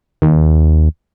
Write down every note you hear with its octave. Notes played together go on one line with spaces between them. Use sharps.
D#2